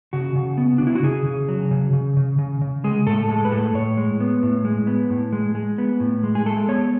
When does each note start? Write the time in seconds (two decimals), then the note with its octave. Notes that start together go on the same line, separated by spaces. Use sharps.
0.13 C#3 F#4
0.35 C#3
0.58 B3
0.78 C#3 D4
0.87 E4
0.95 F#4
1.03 C#3 G#4
1.26 C#3
1.49 F#3
1.71 C#3
1.93 C#3
2.17 C#3
2.38 C#3
2.62 C#3
2.84 G#3 G#4
3.06 A2 A4
3.29 G#3 A4
3.45 B4
3.52 A2 A4
3.74 A2 C#5
3.97 G#3
4.20 B3
4.43 A2
4.65 G#3
4.87 B3
5.10 A2
5.33 G#3
5.55 G#3
5.78 B3
6.00 A2
6.23 G#3
6.35 G#4
6.46 G#3 A4
6.68 B3 C#5